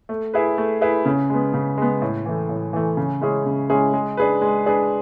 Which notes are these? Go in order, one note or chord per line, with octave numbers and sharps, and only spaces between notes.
A3
E4 G#4 B4
A3
E4 G#4 B4
C#3
G#3 B3
C#3
G#3 B3
A2
E3 A3
A2
E3 A3
C#3
G#3 C#4 E4 G#4
C#3
G#3 C#4 E4 G#4
G#3
D4 G#4 B4
G#3
D4 G#4 B4